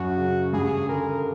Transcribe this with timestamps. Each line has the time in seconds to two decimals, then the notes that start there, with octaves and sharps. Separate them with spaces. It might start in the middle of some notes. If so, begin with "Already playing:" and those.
Already playing: F#2 F#3 F#4
0.17 C#3
0.53 G2 G#4
0.89 D3 A#4